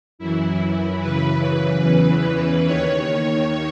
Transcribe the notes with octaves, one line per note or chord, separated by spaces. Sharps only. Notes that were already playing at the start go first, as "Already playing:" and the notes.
F#2 E3 E4
F#2 C#3 E3 B4
E2 C#3 E3
D#2 D#3 C#5